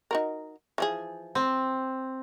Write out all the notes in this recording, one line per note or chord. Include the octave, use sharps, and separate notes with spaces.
D#4 F#4 A#4
E3 F3 G#4
C4